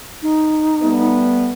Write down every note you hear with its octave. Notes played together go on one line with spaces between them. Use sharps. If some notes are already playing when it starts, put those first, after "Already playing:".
D#4
G3 A3 B3